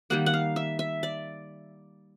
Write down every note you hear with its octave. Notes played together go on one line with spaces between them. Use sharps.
D#3 G3 A#3 F#5
F#5
F5
E5
E5
D5